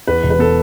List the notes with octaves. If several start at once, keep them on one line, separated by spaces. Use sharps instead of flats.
E2 B4
E1
B4
B2 A4